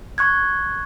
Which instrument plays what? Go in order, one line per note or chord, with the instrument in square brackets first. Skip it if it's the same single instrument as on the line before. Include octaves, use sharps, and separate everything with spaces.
[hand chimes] C#6 F#6 G#6